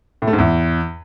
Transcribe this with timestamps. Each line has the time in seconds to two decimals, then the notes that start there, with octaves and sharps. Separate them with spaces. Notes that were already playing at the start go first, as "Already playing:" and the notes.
0.22 A2
0.27 A3
0.33 G#2
0.38 E2